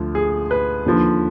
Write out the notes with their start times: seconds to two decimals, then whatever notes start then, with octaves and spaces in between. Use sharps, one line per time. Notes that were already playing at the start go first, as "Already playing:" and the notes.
Already playing: D2 D3 F3
0.15 G#4
0.51 B4
0.86 D#2 D3 F3